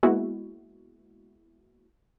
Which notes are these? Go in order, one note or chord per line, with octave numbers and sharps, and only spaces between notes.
G#3 A#3 B3 E4 F#4